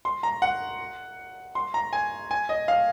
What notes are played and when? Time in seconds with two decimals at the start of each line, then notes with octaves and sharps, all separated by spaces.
0.05 C6
0.23 A#5
0.42 F#5
1.55 C6
1.74 A#5
1.93 G#5
2.31 G#5
2.49 D#5
2.68 F5